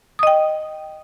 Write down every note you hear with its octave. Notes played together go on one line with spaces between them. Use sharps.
D#5 G5 D#6